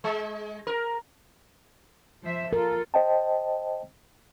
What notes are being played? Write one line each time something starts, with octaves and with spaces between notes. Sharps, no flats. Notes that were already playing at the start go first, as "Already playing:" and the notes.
G#3
A#4
F3 C5 E5
F4 A4 A#4
C5 D#5 G5 A5